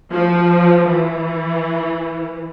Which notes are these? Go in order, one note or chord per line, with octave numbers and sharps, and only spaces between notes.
F3
E3